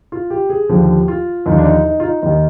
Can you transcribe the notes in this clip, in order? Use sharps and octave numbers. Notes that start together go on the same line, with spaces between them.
F4
G4
G#4
D#2 D3 F3 G4
F4
D#2 D3 F3 D#4
D4
D#4
D#4
F4
D#4
D#2 D#3 D#4